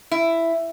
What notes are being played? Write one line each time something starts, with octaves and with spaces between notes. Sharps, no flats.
E4